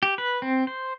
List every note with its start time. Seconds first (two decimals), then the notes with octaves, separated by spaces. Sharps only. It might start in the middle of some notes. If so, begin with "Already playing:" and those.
0.03 G4
0.18 B4
0.42 C4
0.67 C5